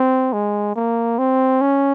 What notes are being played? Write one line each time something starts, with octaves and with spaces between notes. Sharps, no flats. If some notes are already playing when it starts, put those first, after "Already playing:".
Already playing: C4
G#3
A#3
C4
C#4